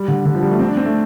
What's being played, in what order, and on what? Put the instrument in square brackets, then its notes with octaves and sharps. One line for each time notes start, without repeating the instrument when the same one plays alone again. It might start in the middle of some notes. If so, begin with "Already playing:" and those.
Already playing: [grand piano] G3
D3
D3
F3
G3
A3
C4
D4
C4
A3